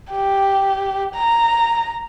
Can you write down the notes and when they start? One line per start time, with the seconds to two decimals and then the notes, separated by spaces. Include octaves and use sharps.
0.10 G4
1.15 A#5